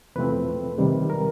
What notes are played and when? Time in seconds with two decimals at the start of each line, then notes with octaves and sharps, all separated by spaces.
0.16 E2 C3 F3 A3 C4 B4
0.78 C3 D#3 G3
1.10 A#4